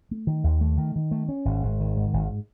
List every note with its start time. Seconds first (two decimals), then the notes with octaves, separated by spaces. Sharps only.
0.11 A3
0.27 D#3
0.44 D#2
0.61 A3
0.78 D#3
0.96 D#3
1.11 A3
1.29 C#4
1.45 G#1
1.63 G#1
1.80 D#3
1.96 G#2
2.13 G#1